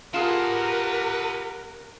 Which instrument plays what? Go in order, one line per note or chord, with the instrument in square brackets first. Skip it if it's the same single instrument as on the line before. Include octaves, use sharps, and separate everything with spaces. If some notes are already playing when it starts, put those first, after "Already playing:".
[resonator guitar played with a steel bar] F4 G#4 [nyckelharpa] G4 F#5 [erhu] A#4 [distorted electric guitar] B4 A5